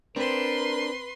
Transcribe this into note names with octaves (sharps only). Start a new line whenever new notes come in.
C4 D4 A#4 B4 C6